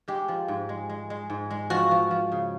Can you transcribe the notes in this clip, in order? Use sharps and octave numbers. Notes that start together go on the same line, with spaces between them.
G#3 G4
F3
G#2
G#3
G#3
G#3
G#2
G#3
F3 F#4
F3
F3
C#3